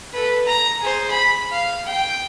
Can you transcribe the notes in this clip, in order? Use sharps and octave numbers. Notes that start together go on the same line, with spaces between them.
A4 B4
A#5
G#4 C5
B5
F5
G5